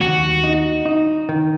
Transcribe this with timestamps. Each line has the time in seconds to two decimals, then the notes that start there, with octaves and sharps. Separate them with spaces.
0.01 D#2 F#4
0.44 D#4
0.86 D#4
1.29 D#3